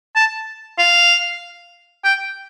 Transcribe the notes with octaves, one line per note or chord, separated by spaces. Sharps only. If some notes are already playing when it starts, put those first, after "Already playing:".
A5
F5
G5